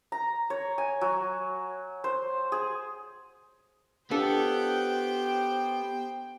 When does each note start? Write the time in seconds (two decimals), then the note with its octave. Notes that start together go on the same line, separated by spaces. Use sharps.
0.12 A#5
0.50 C#5
0.78 G#5
1.01 F#3
2.04 C5
2.52 G#4
4.11 B3 D4 F4 G4 A4 C5 G5